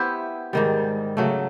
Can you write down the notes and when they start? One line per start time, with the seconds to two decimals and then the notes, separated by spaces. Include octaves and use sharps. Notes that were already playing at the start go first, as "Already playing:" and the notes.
Already playing: B3 E4 G4 C5
0.53 G#2 D#3 G3
1.17 C#3 F#3 A3